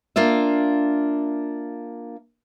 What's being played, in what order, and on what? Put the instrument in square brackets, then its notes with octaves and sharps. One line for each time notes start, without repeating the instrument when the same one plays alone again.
[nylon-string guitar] A#3 D4 F4 E5